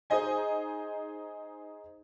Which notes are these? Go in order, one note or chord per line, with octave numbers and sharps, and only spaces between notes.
D#4 G#4 C5 D#5 G#5